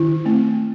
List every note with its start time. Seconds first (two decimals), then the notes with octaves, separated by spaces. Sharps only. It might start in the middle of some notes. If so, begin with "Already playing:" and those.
Already playing: D#3 E4
0.25 A3 C4